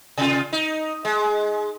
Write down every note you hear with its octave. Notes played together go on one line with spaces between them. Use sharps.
C3 F4
D#4
G#3